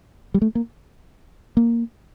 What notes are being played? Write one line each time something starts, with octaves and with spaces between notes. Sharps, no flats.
G3
A3
A#3
A#3